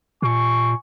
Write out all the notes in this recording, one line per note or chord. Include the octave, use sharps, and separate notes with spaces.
A#2 G#5 C#6